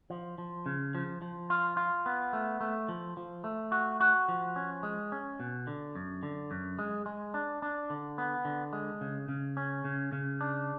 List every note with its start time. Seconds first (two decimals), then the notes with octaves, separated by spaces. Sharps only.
0.10 F3
0.38 F3
0.66 C#3
0.95 F3
1.22 F3
1.50 F4
1.77 F4
2.06 B3
2.33 A3
2.61 A3
2.89 F3
3.17 F3
3.44 A3
3.72 F#4
4.00 F#4
4.28 F3
4.56 C#4
4.83 G#3
5.12 C#4
5.40 B2
5.67 D3
5.95 F#2
6.23 D3
6.51 F#2
6.79 G#3
7.06 G#3
7.34 D4
7.62 D4
7.90 D3
8.18 B3
8.45 D3
8.73 G#3
9.01 C#3
9.29 C#3
9.57 C#4
9.85 C#3
10.13 C#3
10.41 D4